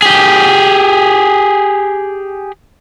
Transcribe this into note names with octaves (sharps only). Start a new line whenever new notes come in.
G4 G#4